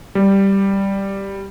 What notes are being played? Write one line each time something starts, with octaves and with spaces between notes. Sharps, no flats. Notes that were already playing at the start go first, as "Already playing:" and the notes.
G3